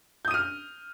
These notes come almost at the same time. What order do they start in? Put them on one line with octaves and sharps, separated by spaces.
G6 D#6 D#7 F6